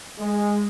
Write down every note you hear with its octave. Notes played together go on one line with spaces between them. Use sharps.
G#3